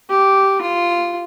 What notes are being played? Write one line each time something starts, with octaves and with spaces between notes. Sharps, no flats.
G4
F4